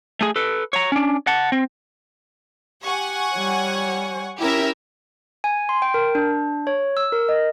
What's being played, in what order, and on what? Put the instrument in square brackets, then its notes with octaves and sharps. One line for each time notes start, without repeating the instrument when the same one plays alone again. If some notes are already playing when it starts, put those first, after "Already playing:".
[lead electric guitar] A3 G#4
A4 B4
C#5 A#5
C#4 D4
F#5 A5
C4
[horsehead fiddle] G4 [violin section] F#5 G#5 C#6
[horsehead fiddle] G3 C#5
[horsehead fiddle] C#4 E4 [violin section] G4 A#4 E5
[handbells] G#5
C6
G5
A#4
D4
C#5
E6
A#4
D#5